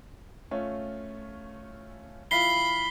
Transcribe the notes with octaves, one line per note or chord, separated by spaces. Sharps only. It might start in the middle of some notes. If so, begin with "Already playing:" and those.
A3 C#4 F4
F3 E4 F4 B5 B6 C7 G7